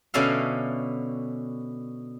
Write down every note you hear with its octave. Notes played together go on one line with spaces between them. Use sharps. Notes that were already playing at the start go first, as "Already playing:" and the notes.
B2 D3 C#4 D5 E5 F5